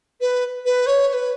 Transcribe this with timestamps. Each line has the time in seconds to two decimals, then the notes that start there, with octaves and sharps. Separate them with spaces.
0.20 B4
0.65 B4
0.86 C#5
1.08 C#5
1.13 B4